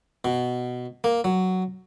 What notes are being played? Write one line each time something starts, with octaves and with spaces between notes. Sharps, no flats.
B2
A#3
F#3